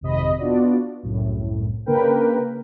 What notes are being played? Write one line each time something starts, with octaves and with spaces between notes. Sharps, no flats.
G#1 F2 C3 D#5 B5
B3 D4 F4 F#4 D5
C2 F#2 A2
C#3 A#3 D4 A#4 B4 G5